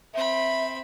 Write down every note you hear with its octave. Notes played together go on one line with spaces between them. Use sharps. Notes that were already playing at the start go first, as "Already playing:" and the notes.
C4 E5 B5